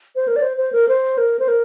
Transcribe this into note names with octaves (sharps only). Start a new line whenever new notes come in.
C5
A#4
D5
C5
C5
A#4
C5
A#4
C5
A#4